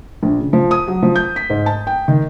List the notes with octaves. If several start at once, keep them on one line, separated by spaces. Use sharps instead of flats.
A#1
C#3
F3
D#6
F#3
F3
G6
B6
G#2
A5
G5
D#3